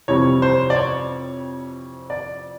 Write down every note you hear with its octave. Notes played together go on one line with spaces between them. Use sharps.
F2 C3 E3 G3 C#5
C5
D5
C#5
D5